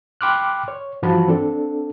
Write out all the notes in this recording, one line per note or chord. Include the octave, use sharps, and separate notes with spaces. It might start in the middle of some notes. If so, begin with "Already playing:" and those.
G5 B5 C6 D6 F6 F#6
C#5
G2 E3 F3 F#4 A5 B5
C4 D4 A4